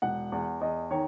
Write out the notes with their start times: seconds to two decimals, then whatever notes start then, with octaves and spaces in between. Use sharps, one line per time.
0.02 E1 F#5
0.32 E2
0.61 E2 D#5
0.91 D#3 C#5